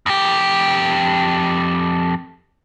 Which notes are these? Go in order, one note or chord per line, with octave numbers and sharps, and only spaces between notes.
F2 G4